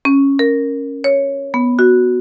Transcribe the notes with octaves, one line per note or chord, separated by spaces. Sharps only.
C#4
A#4
C#5
B3
F#4